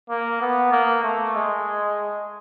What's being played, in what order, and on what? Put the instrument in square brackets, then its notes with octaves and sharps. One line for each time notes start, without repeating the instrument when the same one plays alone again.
[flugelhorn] A#3
B3
A#3
A3
G#3